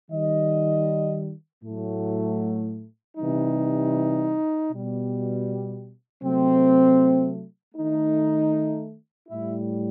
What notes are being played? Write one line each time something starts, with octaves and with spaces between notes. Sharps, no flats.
D#3 G3 D#5
A2 F#3 A3
C3 E3 G3 D#4
B2 G3
C3 F#3 A3 C4
D#3 A3 D#4
A2 G3 E4